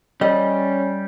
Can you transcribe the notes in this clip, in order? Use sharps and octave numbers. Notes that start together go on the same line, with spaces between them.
G3 C#4 D#5